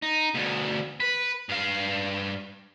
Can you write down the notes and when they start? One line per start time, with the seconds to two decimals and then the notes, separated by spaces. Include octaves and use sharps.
0.02 D#4
0.34 D2 B2
1.00 B4
1.49 G2 F5